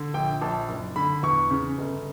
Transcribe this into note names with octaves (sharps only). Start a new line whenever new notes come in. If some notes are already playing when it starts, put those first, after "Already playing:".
Already playing: D3
A#1 G5
A#1 A5
F#1
D3 B5
E2 C#6
C#3
G1